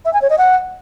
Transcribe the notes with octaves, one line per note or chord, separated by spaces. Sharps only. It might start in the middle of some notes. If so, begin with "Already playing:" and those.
E5
G#5
C#5
D#5
F#5